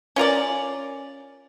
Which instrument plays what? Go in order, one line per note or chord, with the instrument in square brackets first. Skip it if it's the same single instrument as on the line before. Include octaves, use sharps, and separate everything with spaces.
[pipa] C#4 F4 A#4 D5